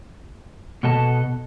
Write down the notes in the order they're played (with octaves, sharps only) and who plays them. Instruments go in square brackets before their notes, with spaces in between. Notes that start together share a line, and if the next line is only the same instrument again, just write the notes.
[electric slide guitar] B2 B3 A4 D#5 A5